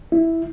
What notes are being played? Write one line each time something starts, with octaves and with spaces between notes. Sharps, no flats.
E4